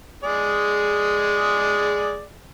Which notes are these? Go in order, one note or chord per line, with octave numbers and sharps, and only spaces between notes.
G#3 G#4 D5